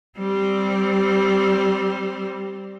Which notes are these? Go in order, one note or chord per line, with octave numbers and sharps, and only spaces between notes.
G3 C4